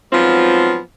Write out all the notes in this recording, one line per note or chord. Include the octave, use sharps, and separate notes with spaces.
G#2 F3 F#3 B3 C4 F4